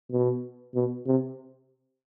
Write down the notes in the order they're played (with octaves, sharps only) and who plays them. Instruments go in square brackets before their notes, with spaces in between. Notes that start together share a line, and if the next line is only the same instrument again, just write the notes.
[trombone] B2
B2
C3